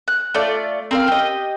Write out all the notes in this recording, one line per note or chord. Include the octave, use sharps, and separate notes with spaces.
F#6
A3 F4 D5
C4 A#4 F5
G4 D#5